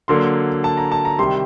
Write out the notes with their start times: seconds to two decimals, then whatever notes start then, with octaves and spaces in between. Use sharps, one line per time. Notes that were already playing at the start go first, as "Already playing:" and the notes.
0.08 D3 F#3 A#3 C6
0.64 A5
0.77 A#5
0.92 A5
1.05 A#5
1.18 C3 D#3 G3 C6